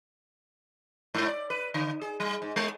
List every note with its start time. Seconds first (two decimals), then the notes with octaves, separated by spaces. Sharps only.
1.15 G#2
1.28 D5
1.50 B4
1.74 D3
2.01 G#4
2.20 G3
2.42 G#2
2.56 G#3